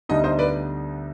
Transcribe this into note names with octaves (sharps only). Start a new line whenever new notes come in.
D2 D3 G3 B3 D#4 D#5
C5 D#5
B4 D5